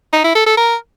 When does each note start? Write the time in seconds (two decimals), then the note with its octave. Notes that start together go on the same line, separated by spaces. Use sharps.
0.13 D#4
0.24 E4
0.35 A4
0.46 A4
0.58 A#4